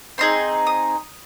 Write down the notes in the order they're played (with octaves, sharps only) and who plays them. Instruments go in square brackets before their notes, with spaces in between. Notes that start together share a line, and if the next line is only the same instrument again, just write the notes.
[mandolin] C4 D#4 G#4 C6
D#6